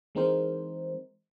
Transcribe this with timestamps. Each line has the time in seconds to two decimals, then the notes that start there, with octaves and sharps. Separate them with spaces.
0.15 E3 G#3 C4 D#4 A#4 C5